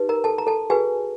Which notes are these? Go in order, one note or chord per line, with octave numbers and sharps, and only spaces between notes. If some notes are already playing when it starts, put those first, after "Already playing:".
Already playing: D#4 G4 B4
A#4 A#5
A4 A5
A#5
A4 A5
F#4 G#4 B4 G#5